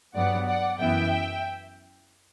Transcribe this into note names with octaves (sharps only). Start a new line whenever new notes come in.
G2 F#3 B3 D5 F#5
D5 F#5
F#2 E3 B3 E5 G5